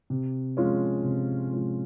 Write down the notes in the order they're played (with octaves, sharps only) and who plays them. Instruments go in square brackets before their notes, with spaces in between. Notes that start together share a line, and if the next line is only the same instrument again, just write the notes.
[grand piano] C3
F3 G#3 C#4 F4
C3
F3 G#3 C#4 F4